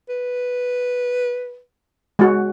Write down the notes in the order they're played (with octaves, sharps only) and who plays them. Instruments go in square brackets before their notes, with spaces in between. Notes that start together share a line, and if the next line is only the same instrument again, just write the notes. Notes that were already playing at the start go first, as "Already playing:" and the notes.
[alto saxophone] B4
[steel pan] G#3 F#4